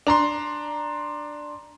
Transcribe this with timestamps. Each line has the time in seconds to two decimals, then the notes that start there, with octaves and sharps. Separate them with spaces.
0.07 D4 A#5 C6